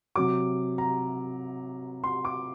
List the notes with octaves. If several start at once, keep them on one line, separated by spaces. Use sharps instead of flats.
C3 F#3 D6
A#5
C6
D6